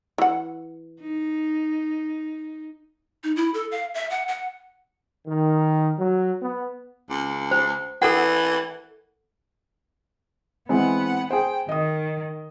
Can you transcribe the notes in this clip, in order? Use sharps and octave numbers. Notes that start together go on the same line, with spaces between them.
E3 F#5
D#4
D#4
E4
A4
F5
E5
F#5
F#5
D#3
F#3
B3
C#2
C5
E3 A4 A#4 F#5
E3 G#3 B3 C4 F#5
G#4 C5 G5
D#3 D#5 D#6